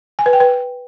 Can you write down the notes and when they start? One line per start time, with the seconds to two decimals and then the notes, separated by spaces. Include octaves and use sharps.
0.19 G#5
0.26 B4
0.33 G5
0.40 B4